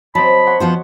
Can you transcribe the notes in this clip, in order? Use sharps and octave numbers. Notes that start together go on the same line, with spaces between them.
F#3 C4 D#5 A5 B5
C#5 F#5 C6
F3 B3 F#4 C5